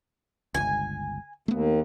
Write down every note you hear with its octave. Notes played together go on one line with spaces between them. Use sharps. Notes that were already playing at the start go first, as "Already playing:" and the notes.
G1 C#2 G#5
D#2 A3 B3